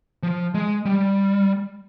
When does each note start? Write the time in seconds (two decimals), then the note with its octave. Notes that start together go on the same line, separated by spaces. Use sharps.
0.23 F3
0.54 G#3
0.85 G3